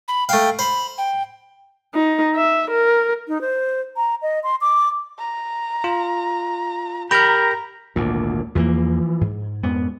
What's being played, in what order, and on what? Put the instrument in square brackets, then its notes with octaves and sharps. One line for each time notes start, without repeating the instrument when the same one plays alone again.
[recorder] B5
[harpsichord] A3 F5 [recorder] G5
[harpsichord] C5 [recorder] B5
[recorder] G5
[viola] D#4
E5
A#4
[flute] D#4
C5
A#5
D#5
C6
D6
[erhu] A#5
[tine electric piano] F4
[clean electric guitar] G4 A#4 [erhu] A#5 [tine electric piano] B5 F6
[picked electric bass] G#1 A#2 [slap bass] D2
[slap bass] E2 A#3 [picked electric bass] E3 F3
[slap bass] G#2
[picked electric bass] F2 G#2 [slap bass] B3